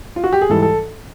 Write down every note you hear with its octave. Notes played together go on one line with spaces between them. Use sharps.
F4
F#4
G4
G#4
G#2 E3 G3 A4
A4